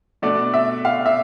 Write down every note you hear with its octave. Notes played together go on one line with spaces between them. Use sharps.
B2 A3 D4 D5
E5
F5
E5